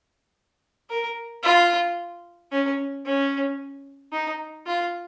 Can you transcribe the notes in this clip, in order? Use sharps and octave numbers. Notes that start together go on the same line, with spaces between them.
A#4
F4
C#4
C#4
D#4
F4